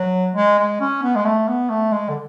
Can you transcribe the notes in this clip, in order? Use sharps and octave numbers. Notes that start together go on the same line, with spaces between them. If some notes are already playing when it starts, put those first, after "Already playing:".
Already playing: F#3
G#3
G#3
C#4
B3
G#3
A3
B3
A3
G#3
D3